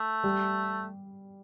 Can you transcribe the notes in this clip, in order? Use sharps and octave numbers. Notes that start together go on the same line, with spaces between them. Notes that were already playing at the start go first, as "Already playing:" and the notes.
Already playing: A3
G3